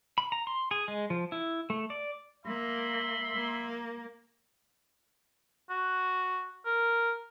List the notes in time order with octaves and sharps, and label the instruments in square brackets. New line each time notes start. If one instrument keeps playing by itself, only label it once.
[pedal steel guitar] B5
A#5
C6
G#4
G#3
F3
E4
A3
D5
[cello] A#3 [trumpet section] E5 B5 C6
[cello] A#3
[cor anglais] F#4
A#4